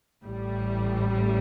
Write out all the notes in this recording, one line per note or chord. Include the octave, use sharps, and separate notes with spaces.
A1 A2 G3